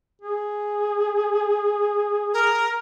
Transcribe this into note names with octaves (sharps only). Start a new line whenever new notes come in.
G#4
A#4